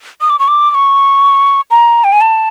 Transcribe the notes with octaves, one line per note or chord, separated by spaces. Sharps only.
D#6
D6
C#6
D6
D6
C#6
A#5
G5
G#5
A5